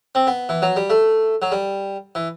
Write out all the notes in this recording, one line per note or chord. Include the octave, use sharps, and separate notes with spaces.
C4
B3
E3
F#3
G3
A3
F#3
G3
E3